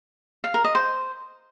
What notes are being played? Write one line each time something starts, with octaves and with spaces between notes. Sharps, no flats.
F5
A#4
D#5
C5